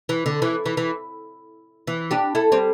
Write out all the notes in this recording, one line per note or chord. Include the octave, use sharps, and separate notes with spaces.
E3
D3
E3
E3
E3
E3
D4 G4
E4 A4
G3 C4